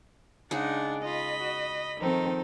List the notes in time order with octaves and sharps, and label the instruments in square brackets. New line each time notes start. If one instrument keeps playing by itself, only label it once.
[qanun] C#3 G#3 D#4 [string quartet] D4 [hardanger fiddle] F#5
[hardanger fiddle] F4 [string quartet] D#5 B5
[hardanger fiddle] F#4
[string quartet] D#3 [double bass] F3 C4 [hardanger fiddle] D#4 A4